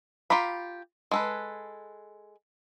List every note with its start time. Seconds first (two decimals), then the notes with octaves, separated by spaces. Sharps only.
0.30 F4 G4 A#5 B5
1.11 G#3 A4 B4